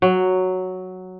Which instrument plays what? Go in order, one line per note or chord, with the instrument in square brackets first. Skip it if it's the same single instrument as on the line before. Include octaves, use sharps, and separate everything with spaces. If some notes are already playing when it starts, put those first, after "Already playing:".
[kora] F#3